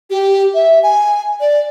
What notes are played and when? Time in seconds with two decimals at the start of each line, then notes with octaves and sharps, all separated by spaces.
0.10 G4
0.54 E5
0.83 G#5
1.40 D5